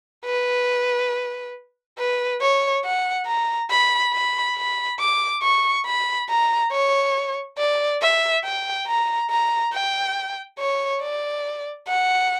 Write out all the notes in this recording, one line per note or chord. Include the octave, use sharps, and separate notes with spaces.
B4
B4
C#5
F#5
A#5
B5
B5
B5
D6
C#6
B5
A#5
C#5
D5
E5
G5
A#5
A#5
G5
C#5
D5
F#5